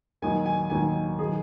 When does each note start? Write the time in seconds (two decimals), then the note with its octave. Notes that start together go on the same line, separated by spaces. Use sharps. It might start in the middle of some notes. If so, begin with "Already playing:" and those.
0.22 D#2 D#3 F#3 G#5
0.46 G#5
0.70 D#2 D#3 F#3 G#5
1.19 D#3 F#3 G#4